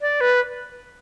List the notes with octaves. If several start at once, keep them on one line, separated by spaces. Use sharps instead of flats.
D5
B4